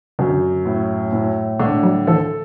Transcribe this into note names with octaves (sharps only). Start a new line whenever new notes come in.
F#2 D3
A2
A2
D3 A3
F#3
E3 A4